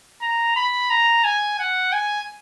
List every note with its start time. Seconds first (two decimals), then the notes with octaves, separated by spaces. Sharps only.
0.22 A#5
0.56 B5
0.90 A#5
1.24 G#5
1.59 F#5
1.93 G#5